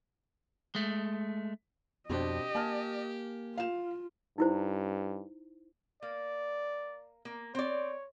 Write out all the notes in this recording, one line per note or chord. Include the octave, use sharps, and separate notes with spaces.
G#3 A3
F2 B2 C4 D4 G4 D#5
A#3 G#5 A5 F6
F4 F5 E7
G2 D#4 E4 C5
A#3 D5
A#3
C4 C#5 D5